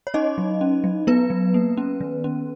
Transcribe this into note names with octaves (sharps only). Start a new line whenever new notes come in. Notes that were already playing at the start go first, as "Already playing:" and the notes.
C#5
C#4 D#4 D#5
F#3
C#4
F#3
F#3 B3 B4
F#3
A#3
C#4
D#3
C#4